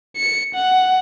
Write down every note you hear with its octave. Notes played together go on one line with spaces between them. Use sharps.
C#7
F#5